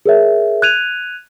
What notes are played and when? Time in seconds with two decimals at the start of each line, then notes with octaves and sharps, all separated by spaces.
0.06 G#4 A#4 C#5 E5
0.62 F#6 G#6 D#7 F7